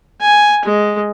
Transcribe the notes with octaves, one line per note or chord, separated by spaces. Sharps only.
G#5
G#3